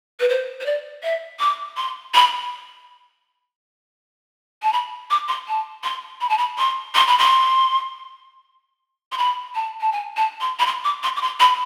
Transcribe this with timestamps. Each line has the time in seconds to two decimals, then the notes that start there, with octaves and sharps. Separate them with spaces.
0.20 B4
0.29 C5
0.60 C5
0.66 D5
1.03 E5
1.39 D6
1.77 C6
2.14 B5
4.62 A5
4.73 B5
5.10 D6
5.28 C6
5.48 A5
5.84 C6
6.21 B5
6.29 A5
6.38 B5
6.58 C6
6.95 C6
7.07 B5
7.18 C6
9.12 C6
9.18 B5
9.55 A5
9.81 A5
9.92 G#5
10.16 A5
10.41 C6
10.59 B5
10.66 C6
10.84 D6
11.03 C6
11.16 D6
11.21 C6
11.40 B5